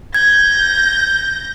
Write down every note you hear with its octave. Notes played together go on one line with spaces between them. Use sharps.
G6 G#6 A#6